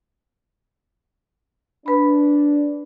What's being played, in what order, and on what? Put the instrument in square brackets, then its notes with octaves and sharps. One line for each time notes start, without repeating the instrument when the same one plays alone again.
[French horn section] D4 [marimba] B4 B5